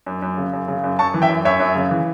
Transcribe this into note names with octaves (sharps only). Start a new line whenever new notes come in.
F#2
F#2
C#3
F#2
C#3
F#2
F#2 A5 C#6
E3
E5 G5
F#2
F#2 C#5 E5
F#2
C#3
E3